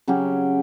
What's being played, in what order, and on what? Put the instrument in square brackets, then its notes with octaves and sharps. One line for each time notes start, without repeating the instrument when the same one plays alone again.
[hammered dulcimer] C#3 F#3 C#4 G4